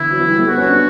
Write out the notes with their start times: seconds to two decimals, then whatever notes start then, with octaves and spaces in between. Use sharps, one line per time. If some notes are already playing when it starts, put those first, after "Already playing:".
Already playing: D3 E3 E4
0.11 F#3
0.20 E3
0.30 G3
0.39 A3
0.48 B3 F#4
0.58 C#4
0.67 D4